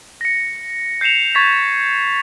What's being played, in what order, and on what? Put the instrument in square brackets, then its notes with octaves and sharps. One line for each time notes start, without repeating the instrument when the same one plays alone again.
[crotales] A#6 C#7
G6 C7 C#7 E7 F7
C#6 G#6 A6 B6